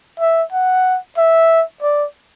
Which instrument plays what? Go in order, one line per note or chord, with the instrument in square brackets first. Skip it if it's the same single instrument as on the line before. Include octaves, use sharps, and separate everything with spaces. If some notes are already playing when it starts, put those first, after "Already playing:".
[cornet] E5
F#5
E5
D5